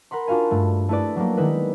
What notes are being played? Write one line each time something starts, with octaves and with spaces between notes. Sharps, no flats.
A#4 F#5 B5 C6
D4 F4 F#4 F5 G#5
G2 A3
A3 E4 G#4 B4 D5
F#3 G3 A3 A#3
D#3 G3 G#3 B3 E4 B4